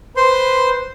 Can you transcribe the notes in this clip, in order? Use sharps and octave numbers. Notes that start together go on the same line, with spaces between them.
B4 C5 C6